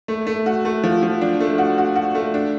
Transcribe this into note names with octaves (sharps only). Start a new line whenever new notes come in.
A3
A3
F#4
A3
F3
F3
D4
A3
F#4
F#4
F#4
A3
D4